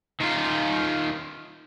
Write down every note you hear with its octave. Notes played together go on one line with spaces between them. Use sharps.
D#3 F4